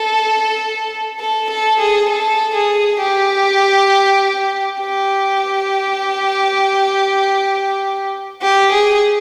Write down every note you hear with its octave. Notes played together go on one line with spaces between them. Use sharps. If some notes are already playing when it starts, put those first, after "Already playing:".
Already playing: A4
A4
A4
G#4
A4
G#4
G4
G4
G4
G#4